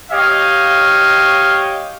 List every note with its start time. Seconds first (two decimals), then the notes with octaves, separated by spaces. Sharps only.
0.10 G4 C#5 D#5 F5